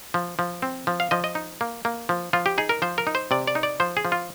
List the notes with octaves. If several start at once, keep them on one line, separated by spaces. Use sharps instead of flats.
F3
F3
C4
F3
F5
F3 D#5
D#5
D#4
A#3
A#3
F3
F3 F4
G4
D#4 G#4
A#4
F3 C5
A#4
D#4
C5
C3 D5
D5
D#4
D5
F3 C5
G#4
F3
F4